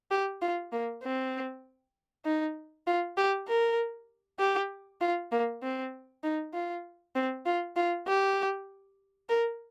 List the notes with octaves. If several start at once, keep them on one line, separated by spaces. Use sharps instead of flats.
G4
F4
A#3
C4
D#4
F4
G4
A#4
G4
F4
A#3
C4
D#4
F4
C4
F4
F4
G4
A#4